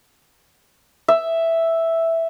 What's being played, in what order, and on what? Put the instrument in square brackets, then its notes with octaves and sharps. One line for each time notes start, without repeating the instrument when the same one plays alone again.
[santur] E5